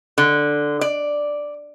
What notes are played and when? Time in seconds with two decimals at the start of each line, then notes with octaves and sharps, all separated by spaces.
0.18 D3
0.81 D5